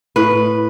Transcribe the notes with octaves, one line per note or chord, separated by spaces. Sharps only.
A2 B4